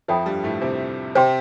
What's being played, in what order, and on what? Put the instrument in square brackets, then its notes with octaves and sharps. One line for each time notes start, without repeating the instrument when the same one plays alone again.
[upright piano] F2 F3 [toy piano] A4 E5 G5 B5
[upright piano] G2 G3
A2 A3
C3 C4
[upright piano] C3 C4 [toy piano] C5 G5 C6